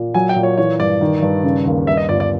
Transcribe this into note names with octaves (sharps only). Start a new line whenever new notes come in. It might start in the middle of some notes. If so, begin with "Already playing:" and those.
Already playing: A#2
F#3 G#5
G5
A#2
C#5
E3 C#5
G2 D5
D#3
G2
C#3
D#2
G2 E5
D#5
G1 D5
D5